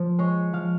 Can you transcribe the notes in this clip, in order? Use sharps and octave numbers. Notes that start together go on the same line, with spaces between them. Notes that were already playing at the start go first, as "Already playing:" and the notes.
Already playing: F3 C5
G#3 C#5
F3 F5